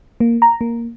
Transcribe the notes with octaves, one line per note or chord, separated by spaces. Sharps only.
A#3
A#5
A#3